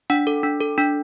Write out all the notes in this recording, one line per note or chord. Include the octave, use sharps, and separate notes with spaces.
D4 F#5
A4
D4
A4
D4